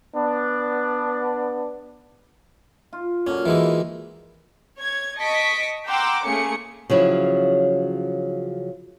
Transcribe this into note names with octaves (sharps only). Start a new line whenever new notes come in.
B3 D4
F4
A#2 D3 F#3 C#4
E3 G#3 D#4 E4
C#5 G#6
D#5 A5 C#6 B6 D7
F#5 G5 A#5 C6 D6 E6
A3 A#3 C#4 G#4 C#7
C#3 F3 F#3 E4